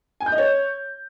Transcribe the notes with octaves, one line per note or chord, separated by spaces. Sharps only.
G#5
G6
D#5
C#5